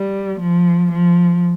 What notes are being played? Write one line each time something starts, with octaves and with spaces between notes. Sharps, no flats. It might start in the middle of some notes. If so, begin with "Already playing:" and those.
Already playing: G3
F3
F3